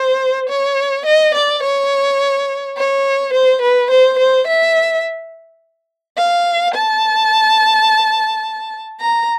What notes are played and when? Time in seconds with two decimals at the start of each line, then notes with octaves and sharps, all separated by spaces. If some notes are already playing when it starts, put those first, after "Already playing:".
Already playing: C5
0.49 C#5
1.06 D#5
1.35 D5
1.63 C#5
2.77 C#5
3.33 C5
3.62 B4
3.90 C5
4.19 C5
4.47 E5
6.17 F5
6.74 A5
9.00 A#5